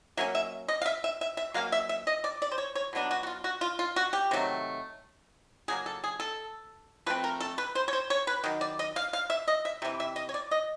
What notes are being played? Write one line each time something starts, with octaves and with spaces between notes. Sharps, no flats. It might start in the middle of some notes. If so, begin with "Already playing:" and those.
F#3 A#3 C#4 E5
E5
D#5
F5
E5
E5
E5
E5
F#3 A#3 C#4 F5
E5
E5
D#5
D5
D5
C5
C#5
C#5
B2 F#3 B3 D4
F#4
F#4
F4
F#4
F4
F4
F#4
G4
C3 D#3 F#3 A3
C#3 F#3 A#3 G#4
A4
G#4
A4
F3 A3 C4 B4
A#4
A4
B4
C5
C#5
C5
C#5
B4
D#3 F#3
D5
D#5
F5
F5
E5
D#5
E5
C3 E3 G3 E5
E5
D#5
C#5
D5
D#5